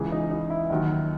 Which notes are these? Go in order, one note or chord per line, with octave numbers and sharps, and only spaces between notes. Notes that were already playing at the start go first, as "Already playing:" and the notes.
Already playing: C#2 C#3 E3 G#4
D#4
D#4
E4
D#2 D#3 F#3 D#5